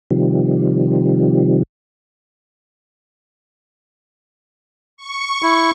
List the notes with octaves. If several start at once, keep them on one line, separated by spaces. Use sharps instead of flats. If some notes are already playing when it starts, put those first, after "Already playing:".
C3 D#3 F3 G3
C#6
E4